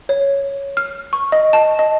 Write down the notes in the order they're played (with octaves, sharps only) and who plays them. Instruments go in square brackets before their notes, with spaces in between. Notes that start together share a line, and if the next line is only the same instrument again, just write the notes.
[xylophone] C#5
F6
C#6
D#5
A5
D#5